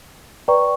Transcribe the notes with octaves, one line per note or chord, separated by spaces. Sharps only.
B4 D5 G5 A#5 C#6